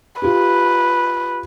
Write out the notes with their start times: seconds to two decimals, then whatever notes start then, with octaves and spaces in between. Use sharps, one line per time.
0.22 F4 G4 B4